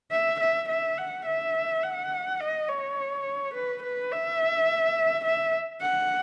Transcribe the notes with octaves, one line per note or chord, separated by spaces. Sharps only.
E5
E5
E5
F#5
E5
F#5
D#5
C#5
B4
B4
E5
E5
F#5